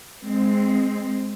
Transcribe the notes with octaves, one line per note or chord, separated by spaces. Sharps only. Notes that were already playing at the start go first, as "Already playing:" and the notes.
G#3 C4